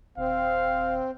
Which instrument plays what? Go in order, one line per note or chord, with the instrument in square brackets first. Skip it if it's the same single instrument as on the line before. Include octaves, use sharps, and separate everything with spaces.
[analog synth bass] D#1 [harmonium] C4 [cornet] F5